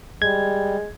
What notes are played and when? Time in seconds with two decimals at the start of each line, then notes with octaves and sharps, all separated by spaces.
0.22 G3 G#3 G#6